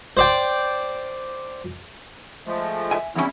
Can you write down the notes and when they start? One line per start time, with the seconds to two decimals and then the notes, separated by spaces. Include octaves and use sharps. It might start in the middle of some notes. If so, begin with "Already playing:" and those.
0.17 C5 D5 G5
2.46 F3 G#3 A3
2.91 E5 G#5
3.15 E2 A2 G3 C#4 E4